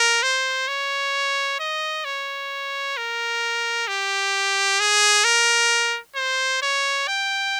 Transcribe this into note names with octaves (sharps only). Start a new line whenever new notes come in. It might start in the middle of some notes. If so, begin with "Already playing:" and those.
Already playing: A#4
C5
C#5
D#5
C#5
A#4
G4
G#4
A#4
C5
C#5
G5